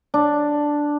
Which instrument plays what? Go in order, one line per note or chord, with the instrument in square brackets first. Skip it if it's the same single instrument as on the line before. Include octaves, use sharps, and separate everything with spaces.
[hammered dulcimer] D4